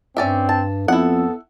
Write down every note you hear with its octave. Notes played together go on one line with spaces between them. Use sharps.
G2 C4 C#4 D5 E5
A5
F2 B3 E4 A4 F#5